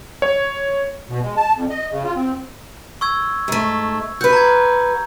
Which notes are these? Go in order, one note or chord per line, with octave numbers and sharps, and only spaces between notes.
C#5
B2
G#3
A5
F2
D#5
C#3
F4
C4
C#6 E6 G#6
G#2 A3
F#4 B4 G6
A#5 G#6